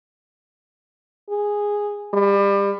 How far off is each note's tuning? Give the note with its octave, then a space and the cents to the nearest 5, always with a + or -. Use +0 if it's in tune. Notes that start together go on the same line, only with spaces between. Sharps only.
G#4 -5
G3 +30